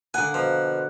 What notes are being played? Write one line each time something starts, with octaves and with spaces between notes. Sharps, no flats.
D3 A#3 F#5 G#5
B2 F3